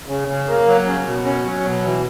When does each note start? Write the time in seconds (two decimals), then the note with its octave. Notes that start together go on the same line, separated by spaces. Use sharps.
0.08 C#3
0.28 C#3
0.48 A#3
0.67 F#3
0.86 C#3
1.06 B2
1.25 C#4
1.45 F#3
1.65 B2
1.84 E3